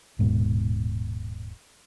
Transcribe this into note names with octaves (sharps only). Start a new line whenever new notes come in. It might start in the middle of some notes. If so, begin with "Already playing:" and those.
D#1 G#2 B2